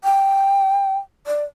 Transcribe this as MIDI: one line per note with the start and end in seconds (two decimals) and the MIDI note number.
0.04 0.98 79
1.27 1.44 74